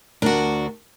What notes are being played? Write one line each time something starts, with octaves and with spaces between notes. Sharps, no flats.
D2 D4 F#4 A#4